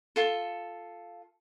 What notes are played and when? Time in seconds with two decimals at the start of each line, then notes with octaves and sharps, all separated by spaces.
0.16 F4 A4